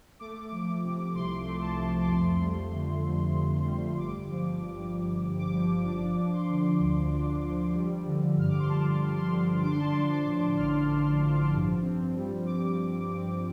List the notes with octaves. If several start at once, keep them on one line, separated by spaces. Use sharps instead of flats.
A3 D6
F3
C3
C2 C6
A3
A5
F3
D6
F2 C6
G3
D3
F2
F2
G3
G1 D6
F3
G2
G1
G1
D6
F3
D4 D6
F3
C6
D3
D2
D4
F3
G3
D3
G2 F6
D6
C6
G1 A5
G3
C6
D3
D4 D6
C6
A5
C6
F3
D6
A2
A1 F6
D4
F3
G2
C4
G3
G2 D6
G2
C4